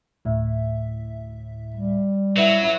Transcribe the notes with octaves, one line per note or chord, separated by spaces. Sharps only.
D2 A2 E5
G3
F#3 E4 B4 E5 F#5